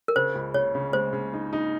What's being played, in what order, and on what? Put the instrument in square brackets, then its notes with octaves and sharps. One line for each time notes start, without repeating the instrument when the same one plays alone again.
[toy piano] A#4
[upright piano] C#3 [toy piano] C5
[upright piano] C#2
[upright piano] C#3 [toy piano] C#5
[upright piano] C#3
[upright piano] G#3 [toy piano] C5
[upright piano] C#3
D#4
D#4